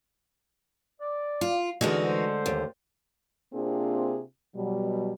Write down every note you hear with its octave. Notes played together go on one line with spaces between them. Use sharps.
D5
F4
D2 D3 E3 G#3 C#4 D#4 F4 F#4
C5
D#2
C3 A#3 C4 D4 F4 G#4
B2 F#3 G3